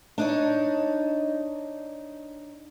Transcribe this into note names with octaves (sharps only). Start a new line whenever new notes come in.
D4 D#4 C#5